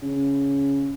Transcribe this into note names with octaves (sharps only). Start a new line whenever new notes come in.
C#3